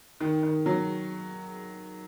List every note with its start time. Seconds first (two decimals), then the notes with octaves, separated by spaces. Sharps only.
0.21 D#3
0.43 D#3
0.66 F#3